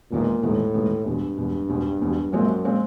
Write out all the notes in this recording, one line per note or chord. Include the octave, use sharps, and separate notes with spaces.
E1 D#2 A#2 D#3 G#3 B3
E1 D#2 A2 D#3 G#3 B3
E1 D#2 D#3 G#3 B3
E1 E2 G2 B2
E1 E2 B2
E1 E2 B2
E1 E2 B2
A#1 F#2 A#2 F3 G#3 C4
A#2 F3 G#3 C4